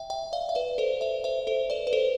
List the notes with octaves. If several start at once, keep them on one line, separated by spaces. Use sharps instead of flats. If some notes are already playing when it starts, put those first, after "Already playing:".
Already playing: E5 G5
E5 G5
D5 F5
E5
B4 D5
A4 C5
C5 E5
C5 E5
A4 C5
B4 D5
B4
A4 C5